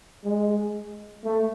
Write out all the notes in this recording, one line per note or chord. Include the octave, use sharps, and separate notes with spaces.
G#3
A3